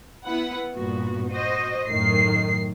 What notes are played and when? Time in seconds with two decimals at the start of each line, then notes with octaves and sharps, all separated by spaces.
0.24 B3 E4 B4 F#5
0.73 G2 A#2 B3 F#4
1.29 F#4 C5 D#5
1.88 F#2 A2 D#3 C7